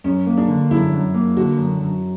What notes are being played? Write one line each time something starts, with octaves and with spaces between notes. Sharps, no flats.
F#2 C#4
A#3
D4
D3
F#2 E4
F#2
A#3
D3 F#4
F#2
F#2